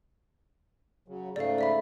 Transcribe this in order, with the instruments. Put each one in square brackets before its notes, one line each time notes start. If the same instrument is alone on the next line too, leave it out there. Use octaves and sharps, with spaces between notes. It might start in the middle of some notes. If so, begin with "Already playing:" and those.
[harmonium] C#3 F#3
[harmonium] G#2 C#3 A3 [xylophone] D5 F5
[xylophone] D5 E5 B5